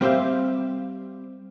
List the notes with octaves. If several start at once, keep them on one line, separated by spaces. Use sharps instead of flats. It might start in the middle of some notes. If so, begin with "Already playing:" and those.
G3 C4 G4 C5 E5 F5